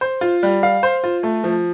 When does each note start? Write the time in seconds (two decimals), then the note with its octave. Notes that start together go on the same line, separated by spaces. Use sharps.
0.01 C5
0.21 F4
0.43 G3
0.63 F5
0.83 C5
1.04 F4
1.23 A3
1.44 F3